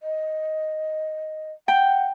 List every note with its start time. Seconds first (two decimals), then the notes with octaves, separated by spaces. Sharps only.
0.03 D#5
1.68 F#5 G5